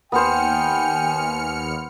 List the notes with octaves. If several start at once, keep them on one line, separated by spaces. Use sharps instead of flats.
D#2 B3 C5 G5 G#5 F6 C#7